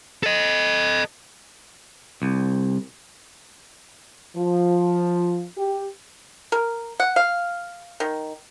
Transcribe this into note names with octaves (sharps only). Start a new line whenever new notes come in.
A4 D#5
C2
F3
G4
A#4
F#5
F5
D#3